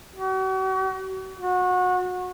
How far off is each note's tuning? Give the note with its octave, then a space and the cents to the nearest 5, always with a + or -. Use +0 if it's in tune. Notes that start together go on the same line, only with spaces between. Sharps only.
F#4 +40
F#4 -25